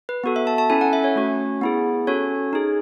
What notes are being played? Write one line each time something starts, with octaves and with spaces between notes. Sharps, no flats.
B4
B3 F#4 A4
E5
A5
A5
C#4 E4 A4 G#5
F#5
E5
C#5
A3 C#4 F#4
B3 E4 G#4
C#4 F#4 A4 C#5
D#4 G#4